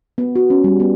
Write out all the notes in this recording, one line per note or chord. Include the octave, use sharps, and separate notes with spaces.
B3
F#4
C#4
G3
B3